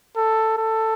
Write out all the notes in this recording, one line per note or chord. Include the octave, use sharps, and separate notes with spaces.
A4
A4